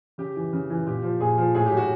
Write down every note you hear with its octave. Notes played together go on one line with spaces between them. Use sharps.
C#3 G4
E3
C#3
E3
A#2 G4
F3
A#2 G#4
F3
A2 G#4
F#3 G4
F#4